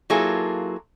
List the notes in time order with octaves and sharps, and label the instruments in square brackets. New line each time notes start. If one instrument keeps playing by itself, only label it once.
[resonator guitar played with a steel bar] F#3 A#3 E4 F4 G#4 A4